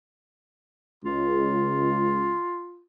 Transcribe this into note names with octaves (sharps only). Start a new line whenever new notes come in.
C#2 F4